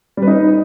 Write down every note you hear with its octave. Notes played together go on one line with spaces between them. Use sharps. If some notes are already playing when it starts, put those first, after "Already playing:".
G3
B4
D#4